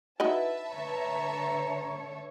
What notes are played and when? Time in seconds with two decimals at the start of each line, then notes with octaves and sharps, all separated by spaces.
0.20 D#4 E4 F#4 B4 D#5 E5 A5
0.71 D3 C#5 A#5